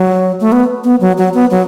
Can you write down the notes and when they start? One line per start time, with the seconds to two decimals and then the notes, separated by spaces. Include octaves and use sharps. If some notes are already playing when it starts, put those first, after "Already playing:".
Already playing: F#3
0.41 A3
0.52 B3
0.84 B3
1.01 F#3
1.18 F#3
1.34 B3
1.51 F#3